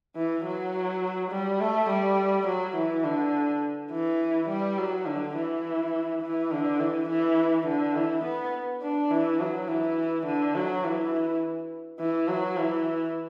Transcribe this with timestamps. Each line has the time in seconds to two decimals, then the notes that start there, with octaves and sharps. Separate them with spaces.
0.16 E3
0.45 F#3
1.31 G3
1.60 A3
1.90 G3
2.47 F#3
2.76 E3
3.04 D3
3.92 E3
4.49 G3
4.78 F#3
5.06 D3
5.36 E3
6.22 E3
6.52 D3
6.80 E3
7.09 E3
7.67 D3
7.95 E3
8.24 B3
8.82 D4
9.11 E3
9.40 F#3
9.68 E3
10.26 D3
10.55 F#3
10.84 E3
12.00 E3
12.28 F#3
12.57 E3